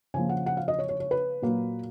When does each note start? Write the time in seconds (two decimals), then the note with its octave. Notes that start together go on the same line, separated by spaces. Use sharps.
0.14 C#3 F3 A#3 G#5
0.29 F#5
0.46 F#5
0.57 F5
0.68 D#5
0.79 C#5
0.89 C#5
1.00 C#5
1.11 B4
1.42 A#2 F#3 A#3